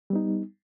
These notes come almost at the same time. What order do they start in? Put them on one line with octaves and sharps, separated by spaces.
G3 B3 D#4